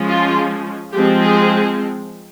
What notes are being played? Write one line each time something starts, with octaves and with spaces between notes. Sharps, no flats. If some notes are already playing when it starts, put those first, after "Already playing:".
Already playing: F3 G#3 C#4
F4
F3 G#3 C4 G4
G#4